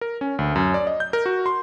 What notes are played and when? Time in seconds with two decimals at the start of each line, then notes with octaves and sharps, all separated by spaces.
0.01 A#4
0.21 C#4
0.39 D2
0.55 F#2
0.74 D5
0.87 D#5
1.00 G6
1.13 A#4
1.26 F#4
1.46 C6